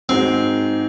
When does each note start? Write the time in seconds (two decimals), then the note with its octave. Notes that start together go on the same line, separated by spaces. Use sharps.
0.09 G#2 D#3 G#3 C4 D#4 F#4